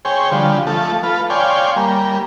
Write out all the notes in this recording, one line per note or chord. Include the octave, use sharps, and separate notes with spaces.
G#4 C5 C#5 G5
D3 F3 G3
F3 A3 A4
F4 A4 B4
C#5 D5 F5 G5 G#5 C6
G3 A#3